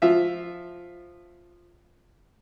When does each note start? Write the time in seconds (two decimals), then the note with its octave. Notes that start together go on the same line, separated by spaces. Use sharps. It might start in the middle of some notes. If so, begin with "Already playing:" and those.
0.02 F3 F4 E5